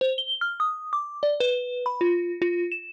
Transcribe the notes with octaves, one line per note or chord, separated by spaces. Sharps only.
C5
G7
F6
D#6
D6
D5
B4
B5
F4
F4
E7